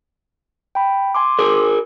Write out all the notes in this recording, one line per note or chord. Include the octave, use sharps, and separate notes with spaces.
G5 B5
G#5 C6 D6
G#4 A#4